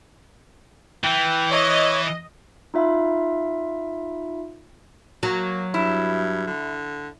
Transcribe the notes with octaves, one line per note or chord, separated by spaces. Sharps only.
E3 G5
C#5 D#5
D#4 F4 E5 F5 B5
F#3 A#3
G2 E4
D3